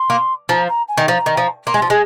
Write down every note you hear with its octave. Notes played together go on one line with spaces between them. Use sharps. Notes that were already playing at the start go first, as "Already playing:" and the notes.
Already playing: C6
A#3
F3 A#5
A#5
G#5
D#3
F3 A#5
D#3
F3
A#3 C6
G#3
F3
G#3